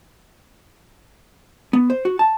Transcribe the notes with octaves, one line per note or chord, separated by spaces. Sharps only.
B3
C5
F#4
A5